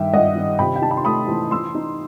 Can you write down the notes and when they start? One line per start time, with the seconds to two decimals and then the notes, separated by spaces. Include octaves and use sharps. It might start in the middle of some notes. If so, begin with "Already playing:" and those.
Already playing: G2 D#3 E5 G5
0.13 G2 D#5 F#5
0.36 D#3
0.59 C3 G5 B5
0.76 G5
0.82 D#4 A5
0.91 B5
0.97 C6
1.05 A3 B5 D#6
1.28 E3
1.51 E3 C6 E6
1.75 D#4